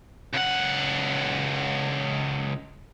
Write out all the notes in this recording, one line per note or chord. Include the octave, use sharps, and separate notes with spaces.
C#2 F#5